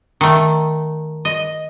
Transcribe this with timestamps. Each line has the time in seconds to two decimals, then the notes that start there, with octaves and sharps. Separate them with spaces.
0.21 D#3 A3
1.25 D#5